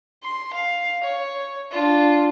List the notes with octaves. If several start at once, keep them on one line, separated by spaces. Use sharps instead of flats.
C6
F5
C#5
D4 F4